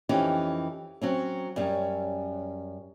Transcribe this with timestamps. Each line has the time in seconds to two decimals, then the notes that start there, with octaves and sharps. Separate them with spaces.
0.09 F2 E3 C#4 D#4 G4
1.02 F#3 C4 C#4
1.56 F#2 G3 C#4